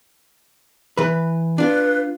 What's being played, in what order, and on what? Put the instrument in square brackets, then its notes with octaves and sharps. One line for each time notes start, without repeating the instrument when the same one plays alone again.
[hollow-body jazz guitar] E3 B4
[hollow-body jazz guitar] D4 F4 [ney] B4